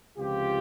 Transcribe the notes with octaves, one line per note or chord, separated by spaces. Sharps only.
C#2 C3 F3 F4 G4